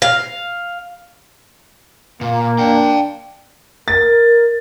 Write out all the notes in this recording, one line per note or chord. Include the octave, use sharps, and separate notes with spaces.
F5
A#2 A#3
D4 F5 G5
A#4 A6